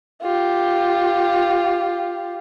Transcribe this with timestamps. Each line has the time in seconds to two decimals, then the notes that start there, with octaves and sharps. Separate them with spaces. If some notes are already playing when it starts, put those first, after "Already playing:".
0.22 F4 G4